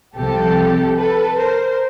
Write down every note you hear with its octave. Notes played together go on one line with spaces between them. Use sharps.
C2 C3 F3 G4 A4
A4 B4
A#4 C5